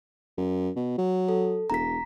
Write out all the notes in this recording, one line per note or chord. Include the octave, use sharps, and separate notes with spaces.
F#2
B2
F#3
A4
E1 A#5 B6